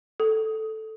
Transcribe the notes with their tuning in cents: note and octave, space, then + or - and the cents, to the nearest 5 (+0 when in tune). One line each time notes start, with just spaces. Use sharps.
A4 -5